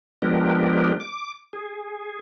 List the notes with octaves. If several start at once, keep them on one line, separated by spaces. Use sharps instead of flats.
F3 G#3 B3 D4 G4 A#4
D6
G#4